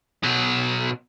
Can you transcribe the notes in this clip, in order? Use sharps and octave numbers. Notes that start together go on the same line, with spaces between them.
B2 F#3